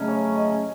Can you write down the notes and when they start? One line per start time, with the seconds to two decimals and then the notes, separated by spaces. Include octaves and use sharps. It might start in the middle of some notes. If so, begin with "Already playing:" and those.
Already playing: C#3 F#3 A3 C#4 D#5
0.08 C#5
0.36 D#5